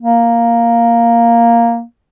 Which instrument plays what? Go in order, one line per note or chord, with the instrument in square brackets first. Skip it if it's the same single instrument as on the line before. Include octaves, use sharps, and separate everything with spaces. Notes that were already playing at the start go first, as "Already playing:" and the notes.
[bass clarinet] A#3